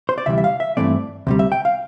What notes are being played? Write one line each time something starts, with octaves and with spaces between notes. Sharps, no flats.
C5
D5
D2 C3 E3 G3 E5
E5
F5
E5
G2 E3 A3 C4 D5
D2 C3 G3
E5
G5
F5